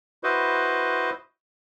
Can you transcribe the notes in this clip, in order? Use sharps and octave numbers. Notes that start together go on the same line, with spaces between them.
E4 F#4 B4 C5 D#5